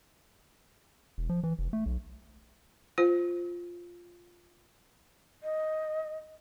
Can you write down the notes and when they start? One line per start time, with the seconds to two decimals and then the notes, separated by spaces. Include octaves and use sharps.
1.18 E1
1.29 F3
1.43 E3
1.59 F1
1.73 A3
1.86 B1
2.98 F4 C5
5.43 D#5